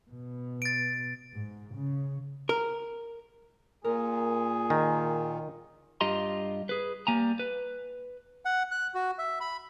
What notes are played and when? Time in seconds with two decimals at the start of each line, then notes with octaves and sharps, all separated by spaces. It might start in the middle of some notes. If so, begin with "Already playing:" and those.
0.11 B2
0.62 A6 D7
1.33 G#2
1.74 C#3
2.49 A#4
3.84 A#2 G#4 A#4
4.70 D#3 G#5
6.01 G2 F4 G4 D#5 A#5 C6
6.69 G#4 B4
7.07 G3 A#3 G#5 A#5
7.39 B4
8.45 F#5
8.71 F#6
8.94 F#4
9.18 E5
9.41 B5